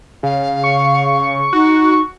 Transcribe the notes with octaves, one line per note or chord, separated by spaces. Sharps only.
C#3 F5
C#6
D#4 F#4